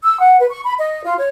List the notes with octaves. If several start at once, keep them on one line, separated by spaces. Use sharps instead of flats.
E6
F#5
B4
C#6
B5
D#5
F4
C#5